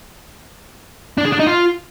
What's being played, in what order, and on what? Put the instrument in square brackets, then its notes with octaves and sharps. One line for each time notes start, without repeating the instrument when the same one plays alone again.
[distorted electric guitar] D4
G#4
D4
D#4
F4